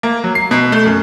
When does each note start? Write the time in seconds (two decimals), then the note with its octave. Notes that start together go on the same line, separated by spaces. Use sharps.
0.03 A#3
0.24 F#3
0.35 C7
0.51 B2
0.72 A3
0.85 F#2